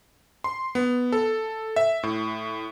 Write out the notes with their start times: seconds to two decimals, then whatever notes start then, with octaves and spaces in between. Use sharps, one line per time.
0.44 C6
0.75 B3
1.12 A4
1.76 E5
2.03 A2